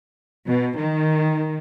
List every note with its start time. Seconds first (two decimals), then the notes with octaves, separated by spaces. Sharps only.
0.47 B2
0.77 D#3